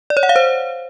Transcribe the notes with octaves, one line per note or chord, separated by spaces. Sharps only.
D5
C#5
F#5
F5
C5